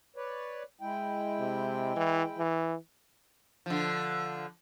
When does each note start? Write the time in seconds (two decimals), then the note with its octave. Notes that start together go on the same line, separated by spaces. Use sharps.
0.16 B4 C#5 D5
0.81 G#3 E4 G5
1.39 C3
1.96 E3
2.39 E3
3.66 D3 F3